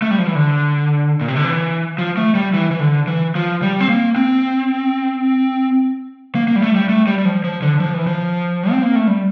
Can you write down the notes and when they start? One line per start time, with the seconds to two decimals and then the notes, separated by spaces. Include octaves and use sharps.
0.02 A3
0.11 G3
0.19 F3
0.27 E3
0.35 D3
1.21 A#2
1.28 C3
1.37 D3
1.45 E3
1.98 F3
2.17 A3
2.35 G3
2.54 E3
2.71 E3
2.80 D3
3.08 E3
3.35 F3
3.62 G3
3.80 C4
3.89 A#3
4.16 C4
6.35 A#3
6.48 A#3
6.56 G3
6.62 A3
6.76 G3
6.89 A3
7.07 G3
7.18 G3
7.25 F3
7.44 F3
7.62 D3
7.80 F3
7.94 E3
8.07 F3
8.71 C4
8.83 A#3
8.95 A3
9.07 G3